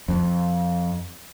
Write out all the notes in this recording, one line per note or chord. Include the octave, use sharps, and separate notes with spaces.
F2